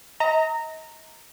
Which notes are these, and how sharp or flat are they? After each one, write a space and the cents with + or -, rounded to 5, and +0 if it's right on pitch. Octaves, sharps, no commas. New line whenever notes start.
D#5 +35 A#5 -20